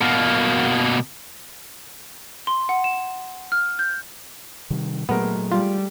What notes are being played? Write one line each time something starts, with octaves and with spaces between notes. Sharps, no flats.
B2 A#3
C6
F#5
E7
F6
G6
C3 D#3 G3
A#2 F#3 G#3 A3 B3 A#4
G3 F4